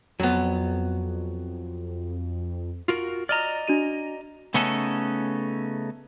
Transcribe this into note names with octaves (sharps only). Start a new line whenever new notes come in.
F2 F#3 B3
F4 F#4 A#4
D5 D#5 A#5 F6
D4 F#4 D#7
C#3 A3 B3 C#4 D#4 A4